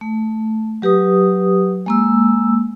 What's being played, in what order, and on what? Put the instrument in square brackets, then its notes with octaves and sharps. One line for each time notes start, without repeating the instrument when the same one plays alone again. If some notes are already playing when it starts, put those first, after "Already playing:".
[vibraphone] A3
F#3 G4 B4 D#6
G#3 A#3 E6